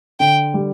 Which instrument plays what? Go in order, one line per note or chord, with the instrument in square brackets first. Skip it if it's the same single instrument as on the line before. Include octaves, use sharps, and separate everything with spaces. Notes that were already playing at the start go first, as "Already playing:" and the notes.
[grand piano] D3 [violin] G5
[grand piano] G3